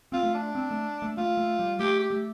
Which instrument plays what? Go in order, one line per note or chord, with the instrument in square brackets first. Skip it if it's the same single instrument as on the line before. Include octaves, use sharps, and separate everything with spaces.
[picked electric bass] C4 [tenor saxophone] F4
[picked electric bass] A3
[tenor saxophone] D4
[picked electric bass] C4
A3
A3
[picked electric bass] A3 [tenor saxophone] F4
[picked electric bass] A3
G3
[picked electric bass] A3 [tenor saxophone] G4
[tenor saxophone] G4
[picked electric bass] A3